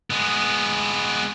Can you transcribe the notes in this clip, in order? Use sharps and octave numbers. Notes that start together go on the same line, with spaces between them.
G#3 B3